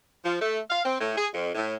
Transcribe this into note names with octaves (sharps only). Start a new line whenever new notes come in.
F3
A3
F5
C4
A2
G#4
F2
A2